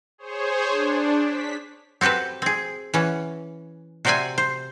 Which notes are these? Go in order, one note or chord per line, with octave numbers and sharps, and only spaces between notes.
G#4 C5 C#5
D4
B6
C4 F#4 G4 A4 B4
C4 G#4
E3 C#4 F#5
C3 F#4 C5 D5 E5 G#5
C5